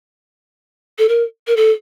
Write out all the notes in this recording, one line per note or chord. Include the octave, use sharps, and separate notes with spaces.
A4
A#4
A#4
A4